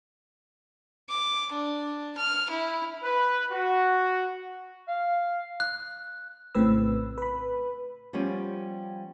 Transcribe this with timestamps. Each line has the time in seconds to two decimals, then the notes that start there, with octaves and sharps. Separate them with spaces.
1.09 D6
1.52 D4
2.17 F6
2.50 E4
3.03 B4
3.51 F#4
4.88 F5
5.60 F#6
6.55 A#1 A2 C#3 C4 B4 E6
7.18 B4 B5
8.13 F3 G3 B3 C#4 G4